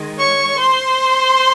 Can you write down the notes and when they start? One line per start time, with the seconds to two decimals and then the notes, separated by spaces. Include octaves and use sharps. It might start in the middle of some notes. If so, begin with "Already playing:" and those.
Already playing: D#3 G#3
0.19 C#5 C#6
0.59 C5 C6